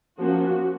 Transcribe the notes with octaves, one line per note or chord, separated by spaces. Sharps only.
F3 A#3 C#4 F#4